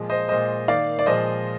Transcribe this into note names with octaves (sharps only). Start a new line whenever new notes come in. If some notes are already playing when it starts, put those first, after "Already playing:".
Already playing: A#2 F3 G#3
C5 D#5
A#2 G#3 C5 D#5
D#3 A#3 D5 F5
D5
A#2 F3 G#3 C5 D#5